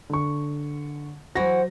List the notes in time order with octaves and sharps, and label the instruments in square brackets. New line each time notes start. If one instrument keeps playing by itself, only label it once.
[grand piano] D3 C#6
[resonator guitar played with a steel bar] E3 F#4 [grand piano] F#3 A#6 [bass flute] C5